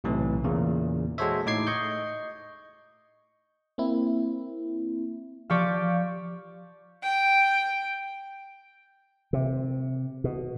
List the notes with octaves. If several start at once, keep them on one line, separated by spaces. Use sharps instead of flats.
B1 A2 C3 E3
E2 A#2 C#3
G#3 F#4 A4 C5 C#5 E5
A2 D#4 D6 G#6 C7
D#5 C#6 G6
A#3 C4 E4
F3 G4 D5 F5 C#6 D6
G5
C3
B2